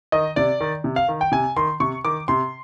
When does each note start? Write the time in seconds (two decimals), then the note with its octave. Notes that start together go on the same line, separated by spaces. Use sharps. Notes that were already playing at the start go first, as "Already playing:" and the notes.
0.12 D#3 D#5
0.36 C3 D5
0.61 D#3
0.84 C3
0.96 F5
1.08 D#3
1.21 G5
1.32 C3 G#5
1.56 D#3 C6
1.80 C3 C#6
2.05 D#3 D6
2.28 C3 C6